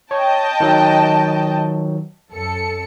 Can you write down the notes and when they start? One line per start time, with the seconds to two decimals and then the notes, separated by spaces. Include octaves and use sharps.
0.11 C#5 D#5 G5 A5
0.60 D#3 F#3
2.30 F#2 A4 C#7